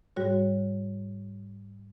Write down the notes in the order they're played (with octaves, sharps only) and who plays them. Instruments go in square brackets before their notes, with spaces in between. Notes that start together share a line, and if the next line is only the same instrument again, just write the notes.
[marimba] G#2 G3 F#4 C#5